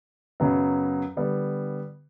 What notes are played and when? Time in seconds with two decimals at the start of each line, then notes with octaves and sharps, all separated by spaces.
0.40 F#2 C#3 F#3 B3
1.17 D3 G3 B3